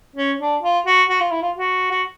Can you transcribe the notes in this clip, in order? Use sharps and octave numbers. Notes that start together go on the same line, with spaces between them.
C#4
D4
F4
F#4
F#4
F4
E4
F4
F#4
F#4